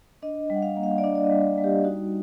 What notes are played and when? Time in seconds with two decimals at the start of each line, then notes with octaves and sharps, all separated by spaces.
0.22 D4 D#5
0.50 G3 F#5
0.62 F5
0.77 A#3
0.83 F5
0.98 D5
1.04 D4 D#5
1.15 D5
1.25 D#5
1.31 G3
1.58 G3
1.64 G4
1.84 D#4 F#4